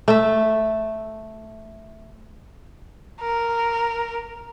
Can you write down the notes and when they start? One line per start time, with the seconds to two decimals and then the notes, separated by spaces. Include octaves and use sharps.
0.08 A3 E5
3.21 A#4